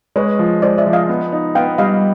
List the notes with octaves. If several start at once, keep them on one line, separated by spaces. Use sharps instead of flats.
G#3 B4 C#5
F3
G#3 C5 D5
D5 E5
F3
D#5 F5
B3
D#4
B3 F5 G5
G3 D#5 F5